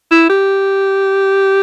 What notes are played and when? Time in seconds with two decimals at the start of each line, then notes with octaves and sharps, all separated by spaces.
0.11 E4
0.29 G4